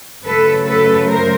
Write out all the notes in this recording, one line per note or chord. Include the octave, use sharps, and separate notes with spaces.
C#3 F#3 A3 A4 B4
A4 B4
A#4 C5